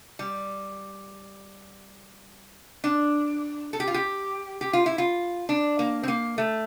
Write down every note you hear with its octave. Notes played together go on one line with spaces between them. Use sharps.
G3
D4
A4
G4
F4
G4
G4
F4
E4
F4
D4
A#3
C4
A#3
A3